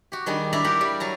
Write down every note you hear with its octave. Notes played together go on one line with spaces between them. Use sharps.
F#4 G4
D#3 G3 D4 G#4
D4 E4 D5 A#5 B5
G4 A#4 F#5
G3
F#3 A5 A#5